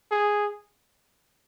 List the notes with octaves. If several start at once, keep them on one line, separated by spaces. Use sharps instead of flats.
G#4